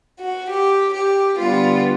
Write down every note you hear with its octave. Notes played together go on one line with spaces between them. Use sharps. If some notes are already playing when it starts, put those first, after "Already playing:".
F#4
G4
G4
D3 G3 B3 F4